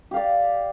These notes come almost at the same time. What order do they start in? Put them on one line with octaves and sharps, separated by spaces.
G4 F5 D5